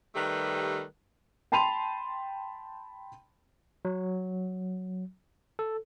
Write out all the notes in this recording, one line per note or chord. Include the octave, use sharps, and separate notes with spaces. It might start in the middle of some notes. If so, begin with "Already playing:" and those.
D#3 G3 A3 G4 B4
G5 A5 B5 C6 D#7 F7
F#3
A4